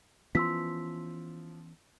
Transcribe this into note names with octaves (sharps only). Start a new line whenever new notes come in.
E3 F3 B3 C#4 C6 E6 B6